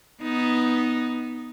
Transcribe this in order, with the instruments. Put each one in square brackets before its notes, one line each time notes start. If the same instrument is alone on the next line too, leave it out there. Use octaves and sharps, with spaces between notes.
[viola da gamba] B3 D#4